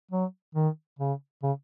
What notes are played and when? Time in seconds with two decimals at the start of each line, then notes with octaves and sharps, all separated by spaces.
0.11 F#3
0.55 D#3
0.99 C#3
1.43 C#3